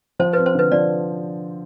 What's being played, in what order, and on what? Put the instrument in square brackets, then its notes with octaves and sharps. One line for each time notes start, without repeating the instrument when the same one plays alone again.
[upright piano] F3 [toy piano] C5
[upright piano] C4 [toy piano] B4
[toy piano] C5
[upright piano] D3 [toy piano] B4
[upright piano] F3 [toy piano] D5